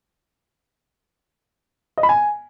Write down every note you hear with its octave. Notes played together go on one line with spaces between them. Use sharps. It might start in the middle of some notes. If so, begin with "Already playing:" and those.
D#5
B5
G#5